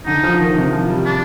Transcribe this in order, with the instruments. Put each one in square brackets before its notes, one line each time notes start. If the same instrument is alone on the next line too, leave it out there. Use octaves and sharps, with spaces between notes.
[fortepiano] D3 [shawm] D#4
[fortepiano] F3
D#3
C3
F3
G3
[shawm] D4